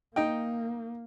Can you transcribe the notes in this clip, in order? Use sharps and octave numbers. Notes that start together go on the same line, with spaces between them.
A#3 D#4 G5